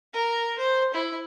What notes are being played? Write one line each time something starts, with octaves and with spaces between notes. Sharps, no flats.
A#4
C5
E4